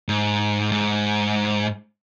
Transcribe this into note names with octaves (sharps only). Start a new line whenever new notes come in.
G#2
G#2